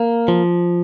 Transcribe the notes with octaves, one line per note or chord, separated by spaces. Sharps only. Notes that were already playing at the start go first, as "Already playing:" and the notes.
Already playing: A#3
F3